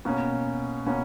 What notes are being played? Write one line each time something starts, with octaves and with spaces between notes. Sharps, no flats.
B2 A#3 C#4
B2 A#3 C#4